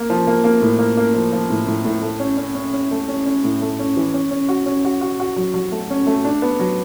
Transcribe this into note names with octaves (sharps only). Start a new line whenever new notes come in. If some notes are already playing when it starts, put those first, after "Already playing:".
Already playing: A#3
F3
A#3
A#3
A2
A#3
A#3
F3
F3
A2
A2
A2
A3
C#4
C#4
C#4
C#4
A3
C#4
C#4
A2
A3
C#4
E3
C#4
C#4
F#4
C#4
F#4
F#4
F#4
F#3
F#3
A3
C#4
A3
D4
B3
F#3